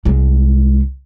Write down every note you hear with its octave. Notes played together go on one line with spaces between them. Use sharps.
C2 G#3